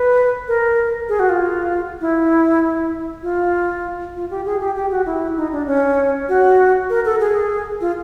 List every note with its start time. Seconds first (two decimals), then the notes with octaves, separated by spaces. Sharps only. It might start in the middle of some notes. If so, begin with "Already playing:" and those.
Already playing: B4
0.48 A#4
1.09 G#4
1.20 F#4
1.29 F4
2.01 E4
3.23 F4
4.15 F4
4.31 G4
4.45 G#4
4.61 G4
4.76 G4
4.91 F#4
5.06 E4
5.37 D#4
5.52 D4
5.67 C#4
6.29 F#4
6.90 A#4
7.05 A4
7.20 G#4
7.81 F4